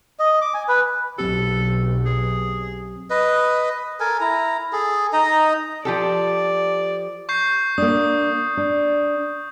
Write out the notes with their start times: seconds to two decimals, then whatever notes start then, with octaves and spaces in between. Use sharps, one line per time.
0.19 D#5
0.41 D6
0.54 G#5
0.68 B4
1.18 B1 F#3 C4 G4 A4
2.06 G#4
3.10 B4 D#5
4.00 A4 A#4 G#5
4.20 E4 A#5
4.73 G#4 A4
5.13 D#4 D#5 A#5
5.85 F3 G4 A4 D5
7.29 C#6 G6 C7
7.78 A#3 D4 D#6
8.57 D4